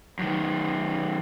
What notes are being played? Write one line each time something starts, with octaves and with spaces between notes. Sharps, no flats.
F#2 D#3